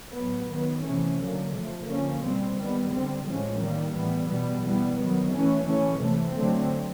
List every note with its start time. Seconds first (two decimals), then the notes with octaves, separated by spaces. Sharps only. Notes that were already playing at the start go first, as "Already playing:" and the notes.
0.17 A2 F#3 B3
0.51 D#3 F#3 B3
0.85 C3 E3 A3 C#4
1.20 D3 F#3 A#3
1.54 C3 F3 A3
1.88 D3 F3 A#3 C#4
2.22 B2 G3 C4
2.57 D#3 G3 B3
2.92 D3 G3 C4
3.26 A2 F3 G#3 C#4
3.60 D#3 G3 A#3
3.94 A2 E3 G3 B3
4.28 B2 G3 B3
4.63 E3 G3 B3
4.97 D#3 F#3 B3
5.31 E3 A3 C#4
5.65 E3 A3 C#4
5.99 C3 E3 A3
6.35 D3 F#3 A3 C4